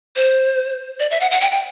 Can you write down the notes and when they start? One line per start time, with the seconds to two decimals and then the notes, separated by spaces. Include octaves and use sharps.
0.16 C5
1.00 D5
1.11 E5
1.21 F#5
1.31 F#5
1.41 G5
1.51 G5